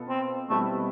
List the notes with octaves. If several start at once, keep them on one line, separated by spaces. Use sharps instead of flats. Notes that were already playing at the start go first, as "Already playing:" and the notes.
Already playing: B2 B3 F4 A4
C4
B2 G3 A3 C4 E4 B4